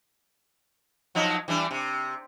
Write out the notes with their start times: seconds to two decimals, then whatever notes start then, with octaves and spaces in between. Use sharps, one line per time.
1.15 F3 F#3 D#4
1.48 E3 G3 D4
1.71 C3